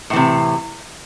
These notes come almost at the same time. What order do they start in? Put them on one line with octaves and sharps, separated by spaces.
A2 E3 C3